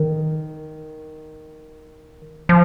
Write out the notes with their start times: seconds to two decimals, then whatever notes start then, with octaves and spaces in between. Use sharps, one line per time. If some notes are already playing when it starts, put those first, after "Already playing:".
Already playing: D#3
2.49 F3